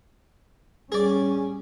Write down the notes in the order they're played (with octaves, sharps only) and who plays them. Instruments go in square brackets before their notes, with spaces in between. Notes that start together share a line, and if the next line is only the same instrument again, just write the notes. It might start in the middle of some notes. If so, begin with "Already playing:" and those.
[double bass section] G3 C#4 [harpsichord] G#4 D5